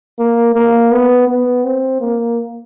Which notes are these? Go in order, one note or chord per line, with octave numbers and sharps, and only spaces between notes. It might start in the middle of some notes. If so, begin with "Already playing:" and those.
A#3
A#3
B3
B3
C4
A#3